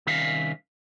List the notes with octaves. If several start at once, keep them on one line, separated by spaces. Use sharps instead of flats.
C2 D#3 C#4 E5 F5